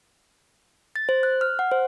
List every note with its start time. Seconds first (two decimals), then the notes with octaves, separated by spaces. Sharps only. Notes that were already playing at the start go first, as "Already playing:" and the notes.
0.96 A6
1.09 C5
1.23 F#6
1.41 F6
1.59 F#5
1.71 C5